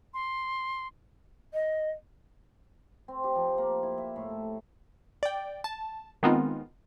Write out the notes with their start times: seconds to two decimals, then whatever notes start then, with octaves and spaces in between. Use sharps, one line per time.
0.14 C6
1.53 D#5
3.08 C4
3.24 G4
3.35 F3
3.58 A#3
3.83 E4
3.98 E5
4.16 A2
4.29 A4
5.23 D5 G5
5.64 A5
6.23 D#3 G#3 B3 C4 D#4 F4